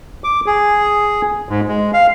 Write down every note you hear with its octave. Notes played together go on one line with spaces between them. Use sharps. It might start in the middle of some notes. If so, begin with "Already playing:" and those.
D6
G#4
G#2
G#3
F5